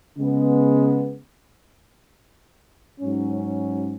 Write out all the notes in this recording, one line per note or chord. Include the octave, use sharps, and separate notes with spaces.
C#3 G#3 B3
G#2 F#3 C#4